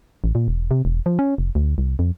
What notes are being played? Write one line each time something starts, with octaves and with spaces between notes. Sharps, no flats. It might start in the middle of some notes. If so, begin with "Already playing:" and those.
A1
A#2
E1
C3
E1
F3
C#4
F1
D2
C2
F2